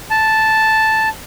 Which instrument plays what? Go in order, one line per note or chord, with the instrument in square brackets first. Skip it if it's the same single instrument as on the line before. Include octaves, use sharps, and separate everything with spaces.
[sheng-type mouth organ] A5